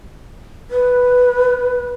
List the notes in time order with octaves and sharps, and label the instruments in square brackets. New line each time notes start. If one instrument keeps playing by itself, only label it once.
[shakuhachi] B4